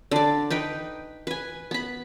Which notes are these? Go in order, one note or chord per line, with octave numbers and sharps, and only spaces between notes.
D3 D5
D#4 B4 G5
B4 G#5
B3 B5